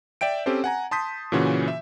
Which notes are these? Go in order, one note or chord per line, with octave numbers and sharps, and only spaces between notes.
D5 E5 G5 D7
C4 C#4 G4 A4 C5
F#5 G#5 A#5
A5 C6 D#6 G6 B6
A#2 C#3 E3 C#4 F#4
E5